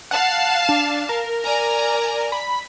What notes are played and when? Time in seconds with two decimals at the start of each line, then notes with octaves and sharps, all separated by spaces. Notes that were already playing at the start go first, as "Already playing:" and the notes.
0.11 F5 F#5 A5
0.69 D4
1.09 A#4
1.44 D5 G#5 A#5
2.32 B5